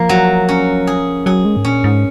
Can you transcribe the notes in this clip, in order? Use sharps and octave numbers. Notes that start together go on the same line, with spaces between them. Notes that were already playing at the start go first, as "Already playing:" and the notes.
Already playing: F3 A#3
F#3
C#4
G#4
F#3 G#4
G#3
G#2
A#2 C#4
G#2